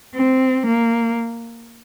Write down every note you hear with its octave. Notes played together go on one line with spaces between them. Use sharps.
C4
A#3